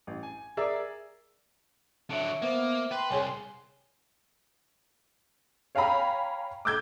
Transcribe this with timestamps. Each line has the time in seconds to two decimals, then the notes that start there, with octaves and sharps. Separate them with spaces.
0.07 A1
0.23 G#5
0.57 G#4 A#4 D5 E5 E6
2.10 D3 F#3 E5 C#7 D7
2.42 A#3 B3 C5 E5
2.92 B4 G5 C6
3.11 C2 G#4 C#5 G#5 G7
5.75 C#5 F5 G5 G#5 A#5 B5
6.65 D6 E6 G6 G#6